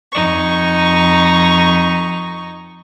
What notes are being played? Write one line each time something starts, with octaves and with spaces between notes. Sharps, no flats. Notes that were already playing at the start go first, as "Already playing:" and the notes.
F2 D#4 C#6